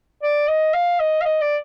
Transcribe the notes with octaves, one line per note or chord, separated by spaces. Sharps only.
D5
D#5
F5
D#5
F5
D#5
D5